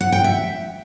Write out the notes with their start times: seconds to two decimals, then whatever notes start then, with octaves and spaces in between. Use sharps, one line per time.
0.01 F#5
0.12 G5
0.24 E5